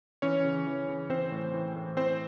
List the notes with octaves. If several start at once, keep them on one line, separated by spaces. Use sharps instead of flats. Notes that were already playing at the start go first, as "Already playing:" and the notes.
E3 C#4 C#5
C#3
E3
C#3
E3 C4 C5
A2
E3
A2
E3 C4 C5